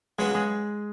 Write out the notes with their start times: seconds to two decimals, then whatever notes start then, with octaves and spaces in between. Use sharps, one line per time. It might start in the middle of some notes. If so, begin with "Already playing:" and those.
0.19 C#3 F#3 G#3 B3 F#4 G#4
0.35 G#3 G#4